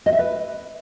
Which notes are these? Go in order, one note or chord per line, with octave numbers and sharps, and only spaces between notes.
D#5
E5
B4